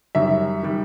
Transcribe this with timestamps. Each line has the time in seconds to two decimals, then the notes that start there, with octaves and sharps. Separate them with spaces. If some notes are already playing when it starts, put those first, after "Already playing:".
0.15 F#2 D#3 G3 E5
0.63 D#3 G3